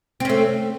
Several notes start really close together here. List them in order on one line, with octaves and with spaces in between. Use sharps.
C4 C#4 A3